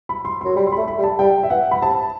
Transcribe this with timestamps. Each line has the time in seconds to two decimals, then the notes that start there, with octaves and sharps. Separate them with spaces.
0.09 B5
0.25 C6
0.41 F#3 C6
0.56 G3 B5
0.67 C6
0.72 B5
0.78 A3
0.88 B5
0.98 G3
1.04 A5
1.19 G3 G5
1.43 E5
1.50 E3 F#5
1.71 B5
1.82 C3 A5